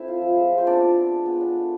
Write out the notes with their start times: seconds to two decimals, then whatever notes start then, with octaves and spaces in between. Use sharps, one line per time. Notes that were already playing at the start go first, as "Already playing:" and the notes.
Already playing: A3 C4 E4 E5
0.08 F4
0.22 F3
0.37 G#3
0.52 C4
0.58 C5
0.66 B3 D4 D5
0.81 F4
0.96 B3
1.11 G#3
1.26 B3
1.41 D4
1.56 A3